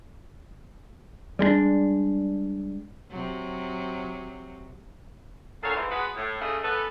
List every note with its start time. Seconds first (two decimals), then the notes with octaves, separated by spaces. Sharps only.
1.39 G3 G#3 B3 D4
3.10 C3 F#3
5.63 D2 A#2 G#3 A4 C#5 F5
5.75 G#2 E3
5.91 F#3 G#3 B3 G#4 B4
6.15 A2
6.41 C#3 A3 D#5
6.63 A3 B3 C#4 A4 B4